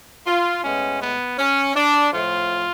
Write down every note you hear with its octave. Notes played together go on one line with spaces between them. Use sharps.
F4
A2 G#3 B3 C#4
B3
C#4
D4
A2 F3 A3 F4